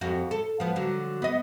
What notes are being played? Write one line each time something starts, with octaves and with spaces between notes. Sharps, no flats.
F2 F#4
A4
F3 B3
D3 F#3
B3 D#5